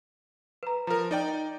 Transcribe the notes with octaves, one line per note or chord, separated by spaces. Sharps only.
B4 A#5
F3 A#4 A#5
D#4 D5 G5